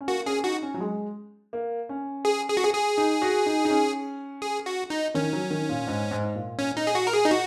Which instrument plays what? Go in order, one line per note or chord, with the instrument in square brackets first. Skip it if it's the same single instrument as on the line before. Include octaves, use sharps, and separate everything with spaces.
[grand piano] C#4
[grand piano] A#3 [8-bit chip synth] F#4
[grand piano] C#4 [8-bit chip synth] G#4
[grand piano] D#4 [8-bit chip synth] F#4
[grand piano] C#4
F#3
G#3
A#3
C#4
[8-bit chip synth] G#4
G#4
F#4
G#4
G#4
[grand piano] D#4
F#4
D#4
D#4
C#4
[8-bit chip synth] G#4
F#4
D#4
[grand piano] D#3 [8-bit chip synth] C#4
[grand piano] F#3
D#3
A#2
G#2
G#2
A#2
[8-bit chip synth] C#4
D#4
G#4
F#4
A#4
G#4
D#4
F#4